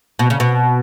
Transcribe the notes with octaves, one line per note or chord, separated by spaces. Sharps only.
B2
C#3
B2